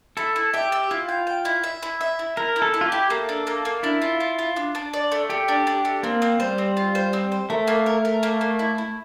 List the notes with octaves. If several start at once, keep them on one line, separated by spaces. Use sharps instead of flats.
E4 A4
E4
G4 E5
E5
E4 F4
G5
G5
E4
E5
E4
E5
E4
E4 A#4
E4
A4
E4
F4
G4
E4
A#3 A4
D4
A#3
A#3
D4 E4
F4
F4
F4
D4
D4
D5
A3
A3 G4
D4
D4
A3
A#3 C4
C4
G3 C5
C4
F4
C5
C4
C5
A3 A#4
A#3
A#4
A#4
A#3
A#3
E4
E4